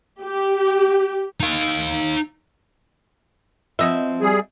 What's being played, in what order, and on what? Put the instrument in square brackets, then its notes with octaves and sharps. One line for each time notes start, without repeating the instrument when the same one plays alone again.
[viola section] G4
[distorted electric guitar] D#4 F5
[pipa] B2 D#5 E5 [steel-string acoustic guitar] F3 C4
[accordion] G3 G#4